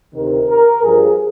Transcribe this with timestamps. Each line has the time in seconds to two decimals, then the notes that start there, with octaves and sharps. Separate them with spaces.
0.15 D2 C3 D#3 A#4
0.49 A#4
0.82 G2 F3 G#4